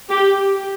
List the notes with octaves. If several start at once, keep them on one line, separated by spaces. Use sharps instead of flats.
G4